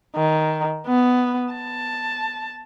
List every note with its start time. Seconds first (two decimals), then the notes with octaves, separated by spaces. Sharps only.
0.16 D#3
0.87 B3
1.53 A5